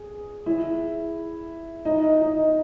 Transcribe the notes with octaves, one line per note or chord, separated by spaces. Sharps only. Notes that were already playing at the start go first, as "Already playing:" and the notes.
Already playing: G#4
E4
D#4
D#4